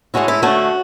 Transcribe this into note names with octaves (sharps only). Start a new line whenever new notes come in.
A2 G#3 C#4 E4 F#4
E4
D3 A3 C#4 F#4